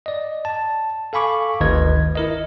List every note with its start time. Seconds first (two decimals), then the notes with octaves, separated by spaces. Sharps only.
0.06 D5 D#5
0.45 A5
1.13 A4 F5 G#5 B5 C#6 D6
1.61 G1 D2 D#3 B4 D#5 G#6
2.16 E4 A#4 D#5